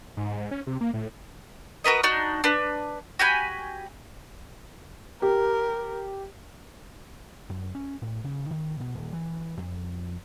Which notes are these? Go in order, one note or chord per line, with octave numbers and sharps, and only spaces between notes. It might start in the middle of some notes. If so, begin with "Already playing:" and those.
G#2
G#2
C#4
C3
A#3
A2
F#4 A#4 B4 D#5
D4 D#4 F#4
D4 B4
F#4 G4 G#5 B5
G4 A#4
F#2
C#4
A2
C#3
D#3
B2
D#1
E3
F2